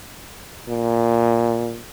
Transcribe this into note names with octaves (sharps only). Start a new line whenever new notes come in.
A#2